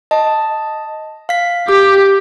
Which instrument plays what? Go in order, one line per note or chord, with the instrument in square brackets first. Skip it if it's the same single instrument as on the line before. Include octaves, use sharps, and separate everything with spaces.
[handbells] D#5 A5
F5 B6
[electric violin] G4 [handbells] D6